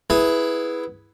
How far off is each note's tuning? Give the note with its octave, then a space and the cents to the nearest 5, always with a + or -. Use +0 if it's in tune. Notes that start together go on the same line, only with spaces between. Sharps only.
B3 +0 E4 +0 G#4 +10